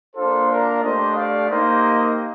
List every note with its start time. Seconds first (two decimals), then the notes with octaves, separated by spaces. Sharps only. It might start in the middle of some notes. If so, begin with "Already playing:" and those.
0.16 A#3 D4 F4 A4 C5
0.49 A#4 D5
0.83 A3 D4 G4 C5 D#5
1.16 D5 F5
1.49 A#3 D#4 G4 C5 D#5